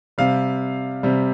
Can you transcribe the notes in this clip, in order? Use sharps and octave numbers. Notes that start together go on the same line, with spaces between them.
C3 G3 F5
C3 G3